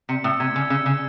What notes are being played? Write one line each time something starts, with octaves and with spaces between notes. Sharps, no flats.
C3 C#7
A2 E6
C3 G#6
C#3 E6
C#3 E6
C#3 C#7